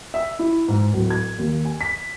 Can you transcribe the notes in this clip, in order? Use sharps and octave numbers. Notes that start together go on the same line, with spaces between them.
E5
E4
G#2
D1
G#6
D#2
G#5
B6